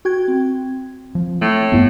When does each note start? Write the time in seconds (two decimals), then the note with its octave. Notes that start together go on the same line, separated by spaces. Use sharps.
0.05 F#4 G5 G#6
0.28 C4
1.15 F3
1.42 A2 A3
1.72 A1 G2 A3 B3 E4